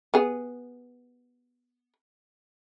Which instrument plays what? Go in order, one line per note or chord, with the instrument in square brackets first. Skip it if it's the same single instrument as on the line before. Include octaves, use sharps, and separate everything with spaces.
[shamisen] B3 G#4